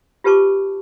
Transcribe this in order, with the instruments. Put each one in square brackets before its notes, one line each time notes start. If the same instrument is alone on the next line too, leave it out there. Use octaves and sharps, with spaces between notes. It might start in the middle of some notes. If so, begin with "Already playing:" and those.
[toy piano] F4 G4 B4 A5 C#6 D6